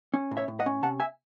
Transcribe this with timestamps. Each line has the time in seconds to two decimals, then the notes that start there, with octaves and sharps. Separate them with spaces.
0.14 C#4
0.31 A2
0.37 C#5 E5
0.48 A2
0.60 D#5 F#5
0.66 C#4
0.83 C3 F#5 A5
1.00 E5 G#5